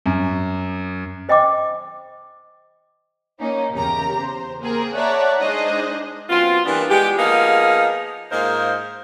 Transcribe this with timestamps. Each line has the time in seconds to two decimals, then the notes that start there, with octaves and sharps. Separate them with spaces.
0.06 F#2
1.29 C5 D#5 G5 B5 D6
3.40 A#3 C#4 D#4
3.73 E2 C#3 G4 A#4 A#5
4.18 C5
4.61 A#3 C4 G#4 A#4
4.96 C#5 D5 E5 F#5 A5 A#5
5.41 G#3 D4 D#4 G#4 C5 D#5
6.30 F#2 B3 C4 F4
6.66 E3 G3 A#3 B3 D4
6.90 G#3 B3 G4
7.19 F3 A#3 B3 D#4 G#4 F5
8.32 G#2 A#3 F4 A#4 C5 D#5